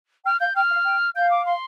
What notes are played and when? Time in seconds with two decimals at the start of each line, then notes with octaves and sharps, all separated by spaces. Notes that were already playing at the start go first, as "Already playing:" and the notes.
0.25 G5 F6
0.40 F5 G6
0.55 G5 F6
0.70 F5
0.85 G5
1.15 F5 G6
1.31 D6
1.46 C6